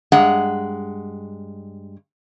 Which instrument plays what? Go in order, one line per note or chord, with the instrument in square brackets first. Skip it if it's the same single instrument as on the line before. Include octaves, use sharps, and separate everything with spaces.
[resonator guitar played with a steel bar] G2 G#3 F#5 A#5